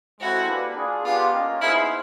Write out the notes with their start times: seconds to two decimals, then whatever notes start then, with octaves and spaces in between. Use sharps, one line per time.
0.20 G#3 C4 E4 F#4 A4
0.47 A#3 D4 G4 B4
0.76 D4 F4 G#4
1.05 B3 D4 F4 G4
1.33 A#3 C#4 F4 A#4 D#5
1.61 B3 D#4 E4 G#4 C5 F5